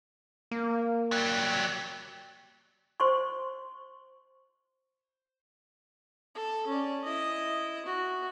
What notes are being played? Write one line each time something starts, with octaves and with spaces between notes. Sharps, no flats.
A#3
F#3 G3
C5 C6 C#6
A4
C#4 D5
E4 D#5
F#4